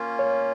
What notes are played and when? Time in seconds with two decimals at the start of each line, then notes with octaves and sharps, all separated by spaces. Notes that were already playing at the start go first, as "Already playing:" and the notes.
Already playing: A#3 C#4 F4
0.19 C#5